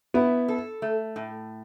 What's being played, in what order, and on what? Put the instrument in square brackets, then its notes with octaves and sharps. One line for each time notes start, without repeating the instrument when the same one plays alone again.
[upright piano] B3 [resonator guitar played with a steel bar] E4
[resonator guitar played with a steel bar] A4
A3
A2